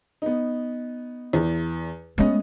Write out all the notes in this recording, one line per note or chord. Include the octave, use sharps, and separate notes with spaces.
B3 D#4
E2
G#3 A3 B3 C#4 D#5